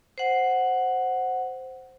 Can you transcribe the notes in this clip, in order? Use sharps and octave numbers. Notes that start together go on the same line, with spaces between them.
C5 F#5